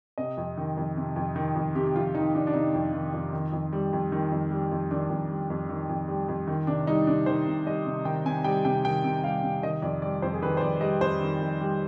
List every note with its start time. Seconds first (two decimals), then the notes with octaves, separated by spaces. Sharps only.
0.18 C3 D#5
0.37 F2
0.58 D#3
0.77 F2
0.97 C3
1.16 F2
1.36 D#3
1.56 F2
1.76 C3 G4
1.95 F2 F4
2.15 D#3 D#4
2.35 F2 D4
2.47 D4
2.54 C3 D#4
2.74 F2
2.94 D#3
3.14 F2
3.33 D#3
3.52 F2
3.73 G3
3.93 F2
4.12 D#3
4.32 F2
4.51 G3
4.72 F2
4.91 D#3 D4
5.10 F2
5.30 G3
5.50 F2
5.69 D#3
5.89 F2
6.08 G3
6.28 F2
6.48 D#3
6.67 C3 D4
6.87 G3 D#4
7.07 C3 D4
7.26 D#3 C5
7.47 C3
7.66 G3 D#5
7.86 C3
8.05 D#3 G5
8.25 C3 G#5
8.44 G3 G5
8.65 C3 G5
8.85 D#3 G5
9.04 C3
9.23 G3 F5
9.43 C3
9.63 D#3 D#5
9.82 F2 D5
10.02 G3 D5
10.22 F2 C5
10.34 G#4
10.42 D#3 B4
10.57 C5
10.61 F2 D5
10.81 G3 D#5
11.01 F2 C5
11.21 D#3
11.41 F2
11.61 G3